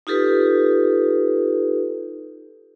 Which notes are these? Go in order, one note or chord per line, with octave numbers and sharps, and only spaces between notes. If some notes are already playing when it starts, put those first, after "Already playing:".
D#4 F4 G4 A4 B4